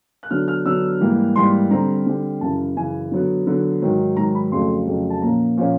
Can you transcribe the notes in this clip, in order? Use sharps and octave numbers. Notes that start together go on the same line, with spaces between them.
F#6
D3 F#3 B3 D4 F6
F6
D3 F#3 B3 D4 E6
G#2 E3 G3 A#3
G#2 E3 G3 A#3 C6
D3 G3 C4 A#5
D3 G3 C4
F#2 C#3 E3 A5
F#2 C#3 E3 G#5
D3 F#3 B3
D3 F#3 B3
G#2 D#3 F#3
G#2 D#3 F#3 A#5
B5
F2 C#3 F#3 A3 C6
F2 C#3 F#3 A3
A5
A#2 F3 A#3 C#4 A#5
A#2 F3 A#3 C#4